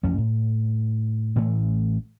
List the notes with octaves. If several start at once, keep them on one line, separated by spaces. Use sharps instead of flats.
A1 F2 C#4
A2
A1 A2 E3 A3